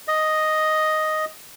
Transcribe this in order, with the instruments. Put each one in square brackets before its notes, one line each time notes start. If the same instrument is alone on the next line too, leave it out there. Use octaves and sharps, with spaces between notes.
[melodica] D#5